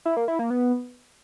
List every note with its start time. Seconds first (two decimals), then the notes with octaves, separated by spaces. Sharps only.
0.05 E4
0.17 A#3
0.28 E4
0.39 A#3
0.50 B3